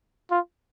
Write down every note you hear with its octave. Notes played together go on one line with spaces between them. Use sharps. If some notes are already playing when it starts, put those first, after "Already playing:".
F4